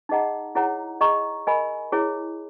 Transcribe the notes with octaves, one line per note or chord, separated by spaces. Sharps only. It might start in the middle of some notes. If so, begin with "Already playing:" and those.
D#4 G#4 D#5 F#5 A#5
E4 G#4 C#5 F#5 A#5
G#4 D#5 A#5 C#6
A#4 D#5 G#5 B5
E4 G#4 C#5